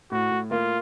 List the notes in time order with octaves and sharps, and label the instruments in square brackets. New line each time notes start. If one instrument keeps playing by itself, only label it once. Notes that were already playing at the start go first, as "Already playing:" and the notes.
[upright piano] A2 [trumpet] F#4
[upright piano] A2
[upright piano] A#3 [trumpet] F4